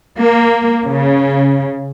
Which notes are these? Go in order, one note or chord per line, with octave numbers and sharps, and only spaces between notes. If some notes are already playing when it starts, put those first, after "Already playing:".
A#3
C#3